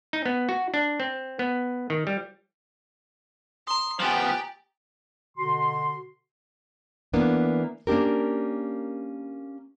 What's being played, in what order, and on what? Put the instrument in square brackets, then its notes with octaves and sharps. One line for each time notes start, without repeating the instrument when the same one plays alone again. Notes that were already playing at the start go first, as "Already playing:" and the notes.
[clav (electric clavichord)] D#4
B3
F#4
D4
C4
B3
D#3
G3
[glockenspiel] A#5 D#6 [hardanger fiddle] C6
[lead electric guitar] F3 B3 [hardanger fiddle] G4 [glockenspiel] G#5 A6 F#7
[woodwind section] B2 D3 F#4 C6
[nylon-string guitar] E3 A#3 B3 D4
A#3 C#4 D4 G4 A#4